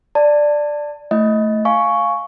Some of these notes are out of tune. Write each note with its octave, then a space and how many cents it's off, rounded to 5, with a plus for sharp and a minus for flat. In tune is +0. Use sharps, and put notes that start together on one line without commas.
D5 +5 A5 +20
A3 +0 E4 +5 D#5 +20
F5 +0 G#5 +20 C#6 +0